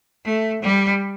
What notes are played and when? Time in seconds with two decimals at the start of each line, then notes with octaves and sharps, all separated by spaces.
0.25 A3
0.63 G3